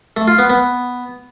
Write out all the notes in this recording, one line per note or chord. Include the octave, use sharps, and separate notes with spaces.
A3
F4
B3
B3